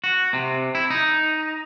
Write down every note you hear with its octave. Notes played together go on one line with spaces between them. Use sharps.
F#4
C3
E4
D#4